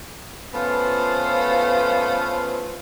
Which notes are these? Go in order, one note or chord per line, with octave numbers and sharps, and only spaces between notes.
A3 B3 C#4 F4 B4 C5